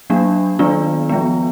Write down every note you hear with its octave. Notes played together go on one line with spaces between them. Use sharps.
F#3 A#3 D4
D#3 F#3 B3 D4 F4
F3 G#3 B3